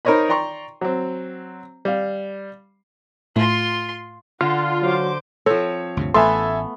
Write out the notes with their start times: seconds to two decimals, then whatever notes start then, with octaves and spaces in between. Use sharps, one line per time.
0.05 D#4 A#4 C5 C#5 D#5 B5
0.29 D5 G5 A#5 C6 C#6
0.81 F#3 C4
1.85 G3 F5
3.36 A2 A3 F4 C6
4.41 D3 F4 F#5 C6
4.82 F#3 C5 D6
5.46 F3 C4 A4 C#5
5.97 D2 G2 C3
6.14 A1 A3 B3 A4 E5 F5 G#5 C6